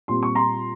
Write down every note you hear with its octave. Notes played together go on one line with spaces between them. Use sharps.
A#2 G3 C4 C6
C#6
A#5 C6